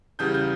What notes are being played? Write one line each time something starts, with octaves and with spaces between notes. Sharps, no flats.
E2 C#3 G3 G6
G6